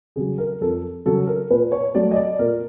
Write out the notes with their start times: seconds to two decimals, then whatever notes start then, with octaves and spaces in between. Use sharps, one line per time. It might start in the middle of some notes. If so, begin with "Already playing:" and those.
0.16 C#3 F#3 G#4
0.38 A#4
0.61 F2 A4
1.06 C#3 F#3 A4
1.27 A#4
1.50 A#2 B4
1.72 C#5
1.94 F#3 A3 D5
2.11 D#5
2.16 D5
2.39 A#2 A#4